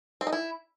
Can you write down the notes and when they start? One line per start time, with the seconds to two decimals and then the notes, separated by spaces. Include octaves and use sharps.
0.21 C4
0.27 D#4
0.33 E4